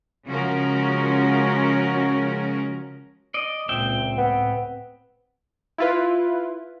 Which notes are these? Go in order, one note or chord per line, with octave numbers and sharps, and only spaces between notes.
C#3 F3 G#3 C#4 F#4 A#4
D5 D#5
C#2 A#2 C4 E5 G5
A2 B3
E4 F4 B4